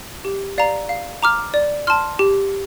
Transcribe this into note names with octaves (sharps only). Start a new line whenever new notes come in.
G4
D5 F5 A#5
F5
A#5 D6 F6
D5
A5 C6 F6
G4